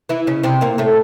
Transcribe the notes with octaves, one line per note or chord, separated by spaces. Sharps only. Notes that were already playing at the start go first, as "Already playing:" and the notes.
E3 E4
C#3 C#4
C3 C4
A#2 A#3
A2 A3